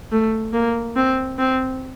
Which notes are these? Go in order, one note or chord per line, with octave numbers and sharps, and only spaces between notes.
A3
A#3
C4
C4